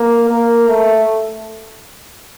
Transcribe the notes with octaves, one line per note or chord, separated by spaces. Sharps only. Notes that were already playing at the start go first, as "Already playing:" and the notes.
Already playing: A#3
A#3
A3